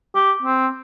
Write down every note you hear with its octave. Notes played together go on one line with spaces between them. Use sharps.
G4
C4